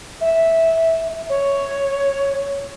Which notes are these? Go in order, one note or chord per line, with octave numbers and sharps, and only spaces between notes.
E5
C#5